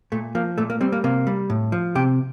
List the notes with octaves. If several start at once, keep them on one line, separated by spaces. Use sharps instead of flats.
A#2 A3
F3 A#3
A#2 A3
A#3
G3 C4
A#3
C3 A#3
G3
A2
F3
C3 G4